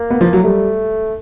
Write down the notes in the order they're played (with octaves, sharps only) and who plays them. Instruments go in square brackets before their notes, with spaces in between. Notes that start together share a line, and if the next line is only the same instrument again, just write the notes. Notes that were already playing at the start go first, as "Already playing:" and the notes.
Already playing: [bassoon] A#3
[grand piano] B3
F3
F#3
[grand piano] G3 [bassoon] A3